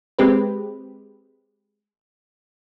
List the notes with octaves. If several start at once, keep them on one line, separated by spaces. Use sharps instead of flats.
G#3 C4 G4 B4